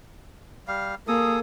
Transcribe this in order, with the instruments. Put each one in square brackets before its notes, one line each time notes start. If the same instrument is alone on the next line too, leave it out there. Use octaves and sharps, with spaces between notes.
[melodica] G3 F5
[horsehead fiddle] A#3 [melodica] G#4 A4 D#6